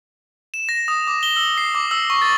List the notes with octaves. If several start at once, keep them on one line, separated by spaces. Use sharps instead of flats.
E7
A#6
D#6
D6
G7
E6
C7
D6
E6
C#6
A6